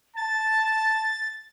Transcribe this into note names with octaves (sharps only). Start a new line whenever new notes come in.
A5 A6